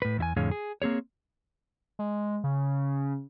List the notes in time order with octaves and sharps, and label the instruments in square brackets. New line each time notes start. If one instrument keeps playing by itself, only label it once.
[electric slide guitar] A2 B4
E2 E4 G#5
F2 A2 D3 G#4 C#5 F5
G#4
A#3 C4 G#4 C#5
[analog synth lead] G#3
C#3